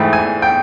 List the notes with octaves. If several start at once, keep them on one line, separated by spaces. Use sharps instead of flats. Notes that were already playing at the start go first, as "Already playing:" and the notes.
Already playing: G#2 E3 A3 G5
G#5
G5